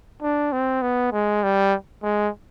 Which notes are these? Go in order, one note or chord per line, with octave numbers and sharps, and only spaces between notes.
D4
C4
B3
G#3
G3
G#3